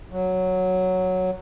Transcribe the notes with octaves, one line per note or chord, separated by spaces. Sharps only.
F#3